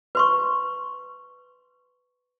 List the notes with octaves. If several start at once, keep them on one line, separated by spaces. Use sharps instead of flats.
B4 C6 C#6